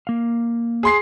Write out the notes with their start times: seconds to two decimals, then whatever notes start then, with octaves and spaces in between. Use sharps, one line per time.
0.07 A#3 F5
0.83 G#4 C6 C7